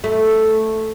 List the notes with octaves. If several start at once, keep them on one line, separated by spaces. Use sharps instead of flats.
A3